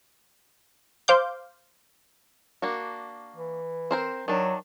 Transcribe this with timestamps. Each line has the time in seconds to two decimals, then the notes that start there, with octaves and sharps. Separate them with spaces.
1.08 C5 F5 D6 G6
2.62 A#3 D4 F#4
3.36 E3
3.91 C4 A#4 C5
4.28 D#3 F#3 D4